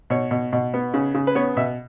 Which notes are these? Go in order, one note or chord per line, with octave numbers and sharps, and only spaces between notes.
B2 C#5
B2
B2
B3
C#3
C#3
B4
B3 C#5
B2 E5